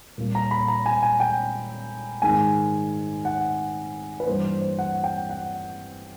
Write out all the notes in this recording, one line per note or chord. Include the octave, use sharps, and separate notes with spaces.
A#2 G3 A#3
A#5
B5
A#5
G#5
G#5
G5
G#2 D#3 G#3 G#5
F#5
B4
G2 E3 G3 A#3 C5
C5
C5
F#5
G5
F#5